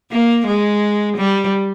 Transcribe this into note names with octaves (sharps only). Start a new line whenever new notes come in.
A#3
G#3
G3